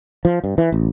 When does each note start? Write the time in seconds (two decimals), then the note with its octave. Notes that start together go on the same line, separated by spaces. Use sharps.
0.25 F3
0.44 G2
0.58 E3
0.72 A1